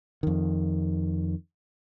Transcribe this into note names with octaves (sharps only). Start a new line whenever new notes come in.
F2 D#3